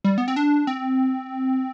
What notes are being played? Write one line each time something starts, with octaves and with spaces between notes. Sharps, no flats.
G3
B3
C4
D4
C4